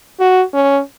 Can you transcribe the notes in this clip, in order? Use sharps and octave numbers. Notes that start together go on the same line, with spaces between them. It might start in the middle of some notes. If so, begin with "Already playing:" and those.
F#4
C#4